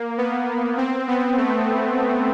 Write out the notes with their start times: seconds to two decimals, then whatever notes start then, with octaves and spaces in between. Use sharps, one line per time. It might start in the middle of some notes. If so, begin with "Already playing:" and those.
Already playing: A#3
0.18 B3
0.77 C4
1.08 B3
1.37 A3